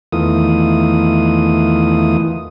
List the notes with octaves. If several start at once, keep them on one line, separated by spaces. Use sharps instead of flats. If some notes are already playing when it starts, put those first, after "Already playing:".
E2 D#3 E3 A3 F4 D#6